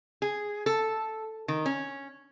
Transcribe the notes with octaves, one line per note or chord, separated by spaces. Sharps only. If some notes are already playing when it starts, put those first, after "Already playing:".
G#4
A4
D#3
C#4